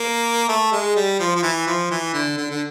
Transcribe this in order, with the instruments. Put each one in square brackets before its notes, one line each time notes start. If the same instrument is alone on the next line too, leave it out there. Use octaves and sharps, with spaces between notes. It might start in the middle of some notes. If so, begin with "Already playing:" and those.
Already playing: [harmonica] A#3
A3
G#3
G3
F3
F3
E3
F3
E3
D3
D3
D3